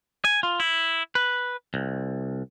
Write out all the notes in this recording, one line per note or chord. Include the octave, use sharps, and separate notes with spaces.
G#5
F4
E4
B4
C2